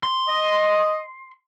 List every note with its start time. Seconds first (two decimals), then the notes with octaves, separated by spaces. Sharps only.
0.03 C6
0.28 D#5